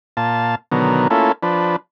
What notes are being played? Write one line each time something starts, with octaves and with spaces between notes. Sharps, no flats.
A#2 F4 A5
B2 D3 D#3 F#3 B3 A#4
A3 A#3 C#4 E4 F4 A4
F3 D4 B4